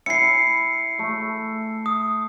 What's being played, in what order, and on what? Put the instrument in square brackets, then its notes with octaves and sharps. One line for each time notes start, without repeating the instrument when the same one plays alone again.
[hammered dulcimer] E4 G#5 [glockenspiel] C7 C#7
[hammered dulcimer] A3
[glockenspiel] D#6